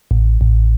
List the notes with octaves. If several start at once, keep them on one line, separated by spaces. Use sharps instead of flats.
A1
A1